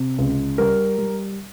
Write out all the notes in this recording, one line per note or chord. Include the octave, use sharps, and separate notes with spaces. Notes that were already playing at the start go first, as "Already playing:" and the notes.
Already playing: C3
C#2
G3 A#4
G3